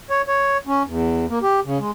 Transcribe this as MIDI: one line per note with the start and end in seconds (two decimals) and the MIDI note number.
0.10 0.22 73
0.28 0.57 73
0.67 0.83 61
0.87 1.26 40
1.29 1.39 58
1.42 1.60 67
1.65 1.78 49
1.79 1.91 56